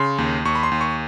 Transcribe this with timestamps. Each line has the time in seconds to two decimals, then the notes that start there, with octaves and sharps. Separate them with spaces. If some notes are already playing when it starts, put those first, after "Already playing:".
Already playing: C#3 C6
0.18 D#2
0.45 D#2 C#6
0.55 B5
0.63 C6
0.72 D#2
0.81 C#6